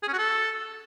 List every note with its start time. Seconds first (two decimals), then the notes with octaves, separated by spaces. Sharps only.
0.03 G#4
0.08 C#4
0.13 F#4
0.18 A4